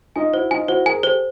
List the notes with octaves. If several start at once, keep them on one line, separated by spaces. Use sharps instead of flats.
D#4 F4 G#5
E4 F#4 C5
D#4 F4 G#5
E4 F#4 C5
G#4 A#4 G#5
G4 A4 C5